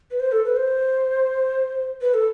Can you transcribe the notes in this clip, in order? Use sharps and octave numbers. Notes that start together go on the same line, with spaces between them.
B4
C5
A4
B4
C5
B4
A4